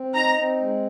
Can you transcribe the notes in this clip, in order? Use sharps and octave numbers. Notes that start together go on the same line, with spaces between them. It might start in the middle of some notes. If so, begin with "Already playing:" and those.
Already playing: C4
D#4 A#5
C4
G#3